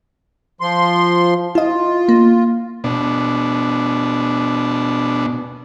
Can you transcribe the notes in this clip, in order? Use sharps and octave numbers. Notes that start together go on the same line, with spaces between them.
F3 C6
E4 F4 D#5
A#3
B2 D4